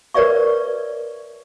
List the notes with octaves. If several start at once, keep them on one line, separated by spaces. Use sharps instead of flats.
A#4 B4 C#5 D5 E5 C#6